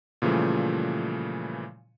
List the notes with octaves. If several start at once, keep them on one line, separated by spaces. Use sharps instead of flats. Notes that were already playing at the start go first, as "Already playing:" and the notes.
A#2 C#3 E3 F3 G3 A3